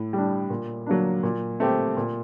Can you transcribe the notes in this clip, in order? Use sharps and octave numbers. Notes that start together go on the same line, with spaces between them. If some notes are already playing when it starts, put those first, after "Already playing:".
Already playing: A2
G3
D4
A#2
F#3 A#3 D4
A#2
A3 C4 G4
A#2